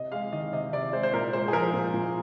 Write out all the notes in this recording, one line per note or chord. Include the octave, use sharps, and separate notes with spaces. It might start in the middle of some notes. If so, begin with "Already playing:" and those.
Already playing: C3 D#5
G#3 F5
D#3 D#5
C3 D#5
C3 D5
G#3 C5
C5
A#2 A#4
G#3 C5
G#4
F3 A#4
A#2
A#2